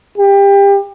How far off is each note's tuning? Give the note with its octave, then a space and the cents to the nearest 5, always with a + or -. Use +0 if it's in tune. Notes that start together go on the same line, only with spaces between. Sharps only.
G4 +25